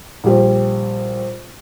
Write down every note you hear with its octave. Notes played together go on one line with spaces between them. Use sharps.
A#1 G3 G4 C5